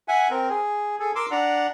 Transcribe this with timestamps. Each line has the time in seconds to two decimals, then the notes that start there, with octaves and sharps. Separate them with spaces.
0.08 E5 F#5 G#5
0.30 C4 A#4
0.49 G#4
1.00 G#4 A4
1.15 A#4 C6 D6 E6
1.31 D4 D5 F#5 A#5